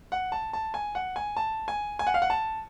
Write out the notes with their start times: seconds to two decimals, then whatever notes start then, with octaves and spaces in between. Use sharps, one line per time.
0.12 F#5
0.32 A5
0.53 A5
0.74 G#5
0.95 F#5
1.16 G#5
1.37 A5
1.68 G#5
1.99 G#5
2.07 F#5
2.14 F5
2.22 F#5
2.30 A5